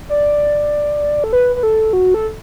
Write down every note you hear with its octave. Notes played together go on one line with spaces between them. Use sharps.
D5
A4
B4
B4
A4
F#4
A4